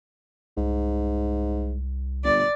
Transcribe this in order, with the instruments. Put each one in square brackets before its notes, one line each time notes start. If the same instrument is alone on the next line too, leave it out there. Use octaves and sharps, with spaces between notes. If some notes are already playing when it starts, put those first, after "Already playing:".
[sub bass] C2 [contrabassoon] G#2
[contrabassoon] G1 [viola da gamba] D5